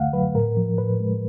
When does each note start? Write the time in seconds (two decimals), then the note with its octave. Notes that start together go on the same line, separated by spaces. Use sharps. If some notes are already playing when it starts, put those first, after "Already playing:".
Already playing: D2 D3 A3 F5 F#5
0.13 F#3 B4
0.35 A2 A#4
0.57 F3
0.78 A2 B4
1.00 G#3